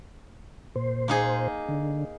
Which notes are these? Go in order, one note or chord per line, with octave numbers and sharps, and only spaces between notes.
A#2 C5
A#3 D#4 G#4
D3